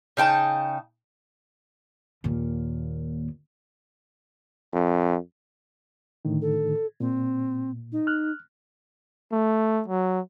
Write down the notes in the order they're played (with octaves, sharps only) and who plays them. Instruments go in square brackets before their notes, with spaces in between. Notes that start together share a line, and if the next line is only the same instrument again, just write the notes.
[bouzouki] C#3 D#4 G5 A5
[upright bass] D#2 A#2
[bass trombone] F2
[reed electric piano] A2 D3 D#3
[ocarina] A4
[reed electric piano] A#2 [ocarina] C4
[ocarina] D#4
[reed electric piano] F6 F#6
[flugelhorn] A3
F#3